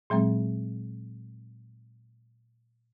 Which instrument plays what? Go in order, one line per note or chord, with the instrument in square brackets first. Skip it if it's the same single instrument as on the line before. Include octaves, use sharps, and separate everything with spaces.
[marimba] A#2 F#3 G#3 C4